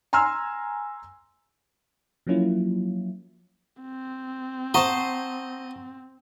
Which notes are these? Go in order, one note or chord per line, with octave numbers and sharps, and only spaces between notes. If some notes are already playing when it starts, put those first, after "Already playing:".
G#5 A#5 C6 E6 F6
F3 F#3 A#3 C#4 E4 F4
C4
C5 D#5 F#5 A5 A#5 C#6